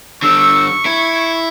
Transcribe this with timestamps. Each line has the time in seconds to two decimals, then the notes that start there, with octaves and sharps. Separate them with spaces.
0.23 D3 G3 C#6 E6
0.86 E4 G#6